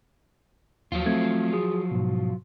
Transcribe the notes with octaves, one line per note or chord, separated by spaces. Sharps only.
D#2 F3 F#3 F4
A3 C4 G#6
F#4 G#4 D#6
G#2 B2